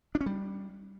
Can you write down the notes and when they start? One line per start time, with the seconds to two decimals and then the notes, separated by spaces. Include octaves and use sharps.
0.15 D4
0.21 C#4
0.26 G3